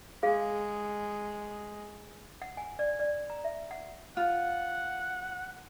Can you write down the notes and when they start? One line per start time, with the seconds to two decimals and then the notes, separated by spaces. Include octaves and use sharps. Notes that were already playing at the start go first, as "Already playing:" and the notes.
0.23 G#3 G#4 F5
2.42 F#5
2.57 G#5
2.79 D5
2.99 D5
3.30 A#5
3.44 E5
3.71 F#5
4.17 F4 F#5